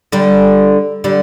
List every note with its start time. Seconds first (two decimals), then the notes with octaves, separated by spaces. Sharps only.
0.12 D3 G3
1.04 D3 G3